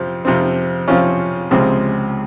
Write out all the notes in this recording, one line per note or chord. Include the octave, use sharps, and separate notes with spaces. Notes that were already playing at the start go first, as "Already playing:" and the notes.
Already playing: F2 C3 F3 C4
F2 C3 F3 C4
F2 C3 F3 C4 C#4 F4
C#2 C3 F3 G#3 C4